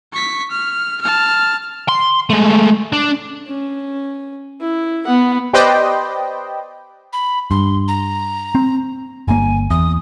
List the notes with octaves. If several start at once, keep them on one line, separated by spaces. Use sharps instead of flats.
C#6 B6
F6
A5 F6
C6
G#3 A3
D4
C#4
E4
B3 F#5
G4 B4 C5 D5 D#5 G5
B5
G2 C6
A#5
C4
G1 A#3 G#5
E2 D#6